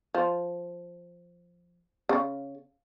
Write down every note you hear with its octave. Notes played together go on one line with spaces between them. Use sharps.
F3
C#3